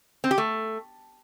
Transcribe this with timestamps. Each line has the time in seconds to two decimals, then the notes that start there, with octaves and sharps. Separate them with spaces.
0.24 C4
0.31 G4
0.38 A3